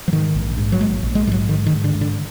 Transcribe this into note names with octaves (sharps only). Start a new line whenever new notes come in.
F3
G#2 D#3
A#1
G#2
F#3
A#1 G#3
A#1
G#3
G#2 F#3 G#3
G#2 D#3
D#3
G#2
D3
G#2
D3